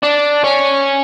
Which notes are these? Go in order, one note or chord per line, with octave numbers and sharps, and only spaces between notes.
D4
C#4